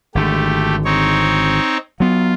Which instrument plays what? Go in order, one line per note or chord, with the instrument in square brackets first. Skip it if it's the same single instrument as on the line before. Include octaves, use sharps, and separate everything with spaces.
[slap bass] G#1 D3 [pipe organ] A3 G4
[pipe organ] C4 D#4 C#5
[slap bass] F#3 B3 [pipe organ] F4